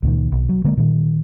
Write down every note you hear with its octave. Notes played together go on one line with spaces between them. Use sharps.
C#2 A#2 D#3
B1
F#3
D3 G#3 A#3
A#2 D#3